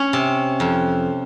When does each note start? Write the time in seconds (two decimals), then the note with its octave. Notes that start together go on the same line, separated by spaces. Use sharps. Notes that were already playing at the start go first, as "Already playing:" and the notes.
Already playing: C#4
0.13 C3
0.60 F2